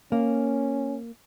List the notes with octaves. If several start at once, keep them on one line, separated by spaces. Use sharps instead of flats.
A#3 C#4